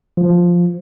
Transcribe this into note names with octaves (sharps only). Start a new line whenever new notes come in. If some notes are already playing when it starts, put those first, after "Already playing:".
F3